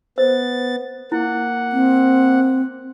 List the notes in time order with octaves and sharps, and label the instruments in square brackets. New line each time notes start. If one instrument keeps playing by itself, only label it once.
[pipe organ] B3 A6 [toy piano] C5
[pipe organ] A#3 F#5 [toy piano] E4
[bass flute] C4